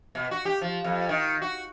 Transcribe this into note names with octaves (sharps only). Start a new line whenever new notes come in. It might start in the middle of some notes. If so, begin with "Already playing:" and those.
B2
F#4
G4
F3
F2
D#3
F#4